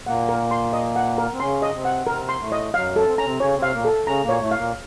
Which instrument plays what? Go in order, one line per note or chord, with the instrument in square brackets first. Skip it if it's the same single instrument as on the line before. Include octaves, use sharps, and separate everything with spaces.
[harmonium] A#2 A#3 [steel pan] F#5
[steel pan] A#4
C6
D#5
F#5
A#4
[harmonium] C4
[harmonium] C#3 C#4 [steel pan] C6
[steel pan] D#5
[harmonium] C3 C4
[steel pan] F#5
[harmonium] C3 C4 [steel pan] A#4
[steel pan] C6
[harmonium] A2 A3
[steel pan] D#5
[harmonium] F#2 F#3 [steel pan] F5
[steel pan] A4
[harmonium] C4
[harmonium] C#4 [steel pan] A#5
[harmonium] C3 C4
[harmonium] C#3 C#4 [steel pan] C#5
[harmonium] C3 C4
[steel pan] F5
[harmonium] A#2 A#3
[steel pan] A4
[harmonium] C#3 C#4 [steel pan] A#5
[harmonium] A#2 A#3
[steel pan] C#5
[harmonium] A2 A3
[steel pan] F5
[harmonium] A#2 A#3